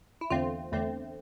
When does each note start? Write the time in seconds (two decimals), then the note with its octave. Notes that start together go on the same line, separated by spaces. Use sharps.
0.21 E4
0.30 E2 D3 A3 C4 F4
0.72 E2 D3 A3 C4